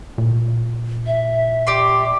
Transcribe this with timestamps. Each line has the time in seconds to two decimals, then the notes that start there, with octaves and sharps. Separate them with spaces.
0.18 A#2
1.07 E5
1.67 G4 D5 C6